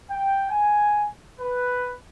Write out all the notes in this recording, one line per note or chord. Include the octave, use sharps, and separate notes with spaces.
G5
G#5
B4